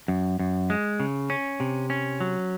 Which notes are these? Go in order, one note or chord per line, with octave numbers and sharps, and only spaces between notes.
F#2
F#2
G#3
C#3
C#4
C3
C#4
F#3